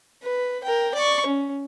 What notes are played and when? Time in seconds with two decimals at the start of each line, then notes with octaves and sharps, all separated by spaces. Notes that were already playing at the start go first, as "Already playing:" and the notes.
0.23 B4
0.64 A#4 G5
0.94 D5 C#6
1.26 C#4